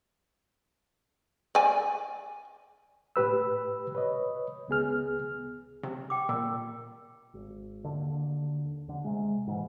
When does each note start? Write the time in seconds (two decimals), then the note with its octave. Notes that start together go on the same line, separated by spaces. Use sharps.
1.55 D5 G#5
3.16 A2 G4 B4 E6
3.95 B4 C#5 D#5
4.68 C#2 B3 G#4 F6
5.83 C3
6.10 G5 D6
6.29 A#2 A#4
7.34 G#1
7.84 D#2 D3
8.87 D#2 D3
9.04 C3 G#3
9.47 G#2 D#3 E3